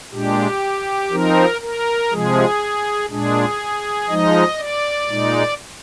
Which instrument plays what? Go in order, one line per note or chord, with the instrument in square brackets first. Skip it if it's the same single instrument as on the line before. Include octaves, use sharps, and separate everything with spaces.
[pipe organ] A#2 G#3 D4 G4
F3 C4 D#4 A#4
A#4
C3 F3 G#3 G#4
A#2 G#3 D4 G#4
F3 G#3 D#4 D#5
D5
A#2 G#3 D#4